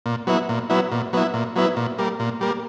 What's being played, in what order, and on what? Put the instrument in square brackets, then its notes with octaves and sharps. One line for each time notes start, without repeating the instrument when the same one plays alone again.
[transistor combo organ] A#2
F#3 B3 E4
A#2
F#3 B3 E4
A#2
F#3 B3 E4
A#2
F#3 B3 E4
A#2
G3 A#3
A#2
G3 A#3